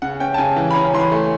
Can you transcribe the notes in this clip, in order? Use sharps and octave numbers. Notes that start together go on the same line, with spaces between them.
C#3 F#5
C#4 G5
A5
C#3 G#5
E3
B5
C#4 A#5
E3 C6
B5
A3